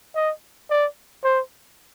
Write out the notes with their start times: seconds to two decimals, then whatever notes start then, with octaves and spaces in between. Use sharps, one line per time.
0.15 D#5
0.70 D5
1.24 C5